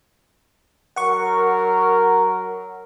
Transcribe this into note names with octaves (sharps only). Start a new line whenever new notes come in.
F#3 A#4 F#5 C#6